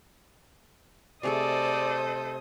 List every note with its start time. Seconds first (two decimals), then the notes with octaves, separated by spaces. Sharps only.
1.23 C3 A3 G#4 A4 C5 D5 D#5 D#6